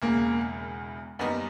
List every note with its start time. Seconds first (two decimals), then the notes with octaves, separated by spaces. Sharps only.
0.02 E1 E2 C#3 A#3
1.19 F#2 D#3 G3 A#3 B3 D#4